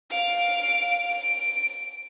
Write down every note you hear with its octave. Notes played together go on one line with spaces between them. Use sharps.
F5 D7
D7